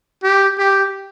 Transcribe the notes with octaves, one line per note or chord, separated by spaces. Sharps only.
G4
G4